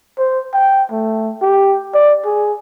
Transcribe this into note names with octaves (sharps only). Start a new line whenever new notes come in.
C5
G5
A3
G4
D5
G#4